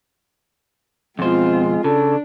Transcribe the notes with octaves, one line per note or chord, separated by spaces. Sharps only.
F2 B2 G#3 C4 F4 C5
C#3 D4 A4